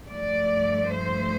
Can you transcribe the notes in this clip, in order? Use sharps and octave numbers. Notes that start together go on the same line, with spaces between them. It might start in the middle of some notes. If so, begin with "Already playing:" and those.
G2 F3 A3 D5
C5